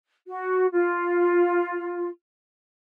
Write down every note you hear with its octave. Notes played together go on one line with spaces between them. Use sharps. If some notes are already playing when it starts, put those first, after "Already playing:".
F#4
F4